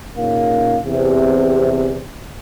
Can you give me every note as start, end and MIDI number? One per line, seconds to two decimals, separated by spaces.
0.18 0.79 46
0.18 0.79 49
0.18 0.79 61
0.18 0.79 63
0.18 0.79 70
0.18 0.79 77
0.85 2.04 40
0.85 2.04 48